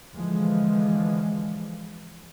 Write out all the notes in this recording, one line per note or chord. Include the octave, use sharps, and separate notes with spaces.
D3 E3 F3 G#3